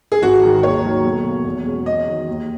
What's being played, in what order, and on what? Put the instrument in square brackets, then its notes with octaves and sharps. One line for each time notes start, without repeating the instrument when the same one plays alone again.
[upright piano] G#4
[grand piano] G#1 [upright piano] F#4
[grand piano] G#2 D#3 G#3
[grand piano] D#2 [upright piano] C#5
[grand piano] D#3 F#3
B1
B2 A#3
E2
B2 G#3 C#4
[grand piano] E2 [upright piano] D#5
[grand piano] D#3 F#3
D#2